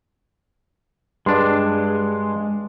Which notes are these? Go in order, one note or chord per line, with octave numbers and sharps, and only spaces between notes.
G2 G#3 D4 C6